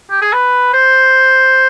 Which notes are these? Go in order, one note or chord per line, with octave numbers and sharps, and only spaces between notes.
G4
G#4
B4
C5